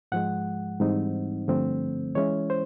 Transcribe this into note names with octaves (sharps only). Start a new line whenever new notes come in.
G#2 F3 G#3 F#5
G#2 E3 G3 C4 D#4
G2 D3 F3 A3 C4
E3 G#3 C#4 E4 C#5
C5